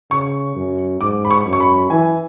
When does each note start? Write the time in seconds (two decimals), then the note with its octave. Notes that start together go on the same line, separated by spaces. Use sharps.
0.10 C#3 C#6
0.56 F#2
1.01 G#2 D6
1.25 B5
1.31 C#6
1.46 F#2
1.53 C#6
1.60 B5
1.90 E3 G#5